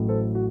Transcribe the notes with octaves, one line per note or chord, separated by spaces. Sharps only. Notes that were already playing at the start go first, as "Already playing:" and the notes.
Already playing: A1 A2 F#3
A4 C5
F#4